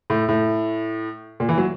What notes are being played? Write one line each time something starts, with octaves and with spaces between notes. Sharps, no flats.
A2
A2
A#2
E3
F#3